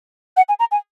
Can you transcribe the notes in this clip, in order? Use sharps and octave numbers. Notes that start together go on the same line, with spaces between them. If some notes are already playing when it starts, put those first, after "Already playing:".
F#5
G#5
A#5
G#5